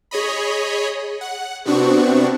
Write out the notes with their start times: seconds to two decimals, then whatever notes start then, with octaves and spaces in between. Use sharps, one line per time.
0.11 G#4 C#5 D#5 B5
1.21 F#5
1.65 C3 B3 C4 D4 F#4 C#6